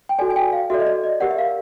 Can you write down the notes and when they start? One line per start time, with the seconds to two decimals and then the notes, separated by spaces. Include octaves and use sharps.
0.09 G5
0.19 F#4 A4 D5 G#5
0.31 G#5
0.36 G5
0.53 F5
0.70 F#4 A4 D5 E5
0.80 D#5
0.87 D5
1.04 D#5
1.20 G4 A#4 D5 F#5
1.31 E5
1.38 F5